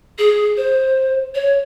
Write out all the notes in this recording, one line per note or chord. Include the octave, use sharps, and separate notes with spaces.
G#4
C5
C#5